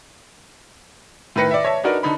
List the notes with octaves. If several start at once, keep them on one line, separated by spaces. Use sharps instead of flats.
A2 D#3 B4 A#6 C#7
D5 E5
C#5 E5 A5
D4 D#4 F#4 A#4 B4 D5
D3 D#4 B5